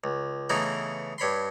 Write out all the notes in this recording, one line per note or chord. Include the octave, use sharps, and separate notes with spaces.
C#2
C#3 E3 A3 B3 D#4 E4
G2 C#5 B5 C6